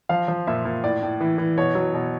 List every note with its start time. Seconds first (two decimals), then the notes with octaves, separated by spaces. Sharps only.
0.09 F3 F5
0.28 F3
0.47 A#2 E5
0.65 A#2
0.83 A2 D5
1.02 A2
1.21 E3
1.38 E3
1.58 B2 C#5
1.75 F#3
1.94 B2